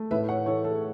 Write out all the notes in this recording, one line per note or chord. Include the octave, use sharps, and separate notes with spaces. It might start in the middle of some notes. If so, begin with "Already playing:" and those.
Already playing: A3
A2 B4 E5
C#5 F#5
E3 A4 C#5
A4